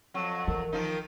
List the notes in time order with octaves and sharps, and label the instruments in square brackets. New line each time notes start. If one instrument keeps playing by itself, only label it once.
[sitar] F2 F#3 [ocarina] C#6
[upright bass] E3 [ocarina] A#4
[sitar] D#3 F3 D#4